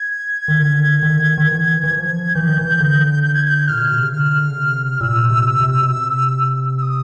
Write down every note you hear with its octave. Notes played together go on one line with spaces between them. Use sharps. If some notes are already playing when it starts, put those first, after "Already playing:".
Already playing: G#6
D#3
D3
D#3
D#3
E3
E3
F3
E3 G6
D#3
E3
D3
G6
G#6
G#6
G6
A#2 F6
B2
C3
C#3
D3 F6
C#3
C3
A#2 E6
C3
C3
B2
C3
E6
D#6